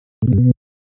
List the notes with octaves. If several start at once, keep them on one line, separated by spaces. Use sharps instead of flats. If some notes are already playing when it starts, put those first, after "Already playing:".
A2
B2
G2
B2